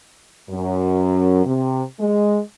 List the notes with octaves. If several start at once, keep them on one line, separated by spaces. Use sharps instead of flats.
F#2
C3
G#3